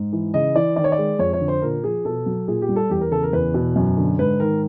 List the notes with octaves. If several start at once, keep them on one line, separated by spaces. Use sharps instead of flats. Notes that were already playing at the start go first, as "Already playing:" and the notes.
Already playing: G#2
E3
C#3 D#5
E3 D5
D#3 D5
C#5
D5
G#3
F2 C#5
C#5
D3
C5
A#2 A#4
F3 G#4
B2 A4
F#3
A#2 G#4
G4
G3
A4
E2 G4
A#4
C#3 A4
A#4
E2 B4
B2
F#2
D3
G#2 B4
D#3 A#4